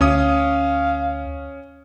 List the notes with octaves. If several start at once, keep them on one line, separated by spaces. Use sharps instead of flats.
D2 C#4 F5 D#6